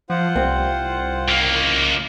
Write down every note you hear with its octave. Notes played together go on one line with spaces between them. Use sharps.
F3 F4 C5 F#5
C2 C4
C#2 A#3